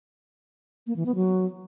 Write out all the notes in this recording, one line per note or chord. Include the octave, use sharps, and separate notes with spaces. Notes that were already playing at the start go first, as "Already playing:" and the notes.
A#3
E3
B3
F#3